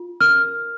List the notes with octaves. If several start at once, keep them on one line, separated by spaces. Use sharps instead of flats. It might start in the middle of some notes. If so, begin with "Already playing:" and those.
Already playing: F4
A#4 F6